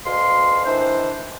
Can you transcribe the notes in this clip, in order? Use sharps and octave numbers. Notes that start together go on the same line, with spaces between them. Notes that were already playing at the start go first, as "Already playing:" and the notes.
D2 B2 F5 C6
D#3 E3 D4 C5